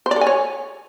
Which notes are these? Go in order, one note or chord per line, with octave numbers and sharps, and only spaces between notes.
C5
D5
A4
G#5
C#5